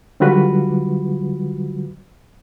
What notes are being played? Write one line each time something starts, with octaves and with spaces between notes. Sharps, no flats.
D3 F#3 G3 F4 F#4 B4